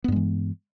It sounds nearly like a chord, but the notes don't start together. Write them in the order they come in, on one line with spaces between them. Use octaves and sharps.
B3 G2 G#3 E3